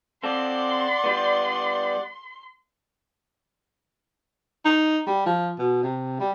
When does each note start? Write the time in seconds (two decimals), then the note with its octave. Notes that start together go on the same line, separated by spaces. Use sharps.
0.23 C4 A4 D5 F#5 C6 D6
1.04 G3 B3
4.65 D#4
5.07 G3
5.26 F3
5.59 B2
5.83 C3
6.20 G3